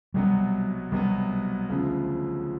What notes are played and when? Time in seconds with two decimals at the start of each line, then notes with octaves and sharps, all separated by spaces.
0.14 C2 B2 F#3 G3 B3
0.91 C2 B2 F#3 G3 B3
1.70 D2 C#3 F3